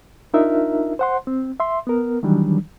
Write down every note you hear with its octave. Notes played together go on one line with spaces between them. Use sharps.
D4 D#4 F4 A#4 E5
C5 F#5 C6
C4
E5 C6
B3 A#4
D#3 E3 F#3 G3 D4